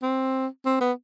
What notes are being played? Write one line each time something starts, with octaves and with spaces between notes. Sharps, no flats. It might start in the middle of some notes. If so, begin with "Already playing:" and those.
C4
C4
B3